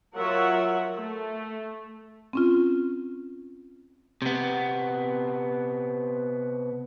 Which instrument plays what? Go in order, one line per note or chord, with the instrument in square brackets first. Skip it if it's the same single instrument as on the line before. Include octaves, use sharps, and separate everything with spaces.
[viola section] F#3 F4 A#4 C#5 E5 F#5
A3
[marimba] C4 C#4 F4
[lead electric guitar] C3 B3